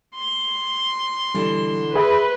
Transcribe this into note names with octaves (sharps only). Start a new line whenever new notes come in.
C6
B2 D3 E3 G3
G#4 B4 E5 B5